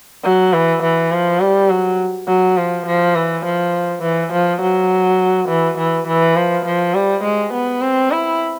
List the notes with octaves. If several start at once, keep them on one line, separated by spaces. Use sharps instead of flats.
F#3
E3
E3
F3
G3
F#3
F#3
F3
F3
E3
F3
E3
F3
F#3
E3
E3
E3
F3
F3
G3
G#3
B3
C4
E4